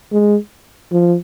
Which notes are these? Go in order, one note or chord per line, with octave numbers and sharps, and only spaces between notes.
G#3
F3